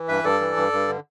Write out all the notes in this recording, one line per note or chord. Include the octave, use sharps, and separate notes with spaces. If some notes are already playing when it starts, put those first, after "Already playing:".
Already playing: E3
G2 B4 E5
G2 A4 D5
E3
G2
G2
D3